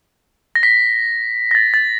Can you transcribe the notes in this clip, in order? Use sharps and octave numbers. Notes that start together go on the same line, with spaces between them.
A#6
B6
A#6
A6
A6